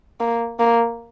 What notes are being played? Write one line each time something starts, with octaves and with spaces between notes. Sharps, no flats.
A#3
A#3